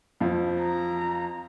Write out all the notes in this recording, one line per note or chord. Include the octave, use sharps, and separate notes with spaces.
F2 F3
A#5